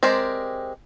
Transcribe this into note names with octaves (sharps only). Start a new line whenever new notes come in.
G#3 C4 G4 A#4 D5